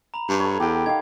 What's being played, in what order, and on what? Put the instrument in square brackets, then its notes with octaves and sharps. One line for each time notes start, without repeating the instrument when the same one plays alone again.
[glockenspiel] A#5 B5 F7
[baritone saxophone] G2
[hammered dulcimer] A4 C#5 [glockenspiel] B5
[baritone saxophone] E2 [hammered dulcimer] G4 F#5 G5
[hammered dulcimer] D#3 D#5 F5 [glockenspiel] G#6